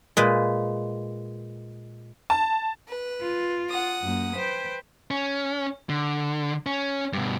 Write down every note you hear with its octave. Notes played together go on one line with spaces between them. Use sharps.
A#2 G#3 B4
A5
B4
F4
F#5 D#6
F#2 A#3
B4 C5 G5
C#4
D3
C#4
G2 B2